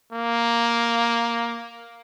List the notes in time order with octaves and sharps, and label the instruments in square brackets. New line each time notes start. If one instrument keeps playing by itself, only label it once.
[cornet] A#3